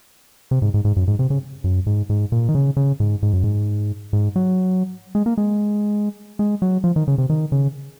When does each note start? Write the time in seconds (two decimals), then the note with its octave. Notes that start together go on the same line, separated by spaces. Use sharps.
0.51 C3
0.62 G#2
0.74 G#2
0.85 G#2
0.96 F#2
1.08 G#2
1.19 C3
1.30 C#3
1.64 F#2
1.86 G#2
2.10 G#2
2.32 A#2
2.48 D#3
2.55 C#3
2.77 C#3
3.00 G#2
3.23 G#2
3.33 F#2
3.44 G#2
4.13 G#2
4.36 F#3
5.15 G#3
5.26 A#3
5.38 G#3
6.39 G#3
6.62 F#3
6.84 F3
6.96 D#3
7.08 C#3
7.18 C3
7.30 D#3
7.52 C#3